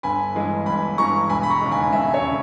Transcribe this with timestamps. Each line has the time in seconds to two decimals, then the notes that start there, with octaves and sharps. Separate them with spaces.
0.03 G1 G#5 B5
0.35 G2 E3 G#3
0.66 G1 G#5 B5
0.98 G2 E3 G#3 A#5 C#6
1.29 E1 G#5 B5
1.43 B5
1.50 A#5 C#6
1.61 D#2 C#3 G#3
1.72 G#5 B5
1.93 E1 E5 G#5
2.14 C#5 E5
2.26 C#3